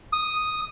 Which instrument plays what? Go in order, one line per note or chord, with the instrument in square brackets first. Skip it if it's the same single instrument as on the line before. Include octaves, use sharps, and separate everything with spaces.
[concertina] D#6